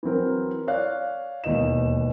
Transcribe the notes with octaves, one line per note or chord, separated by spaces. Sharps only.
E3 F#3 C4 A#4
C#5 D5 F5 F#6
E1 D#2 E3 D#5 E7